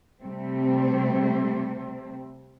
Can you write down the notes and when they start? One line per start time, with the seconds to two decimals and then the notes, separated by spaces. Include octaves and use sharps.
0.21 C3 G3 A3 C4